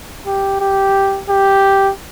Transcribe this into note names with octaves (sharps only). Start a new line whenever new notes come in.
G4
G4
G4